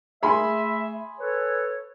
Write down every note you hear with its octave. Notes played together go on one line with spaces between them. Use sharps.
A3 G#4 E5 B5 C6
A4 B4 C#5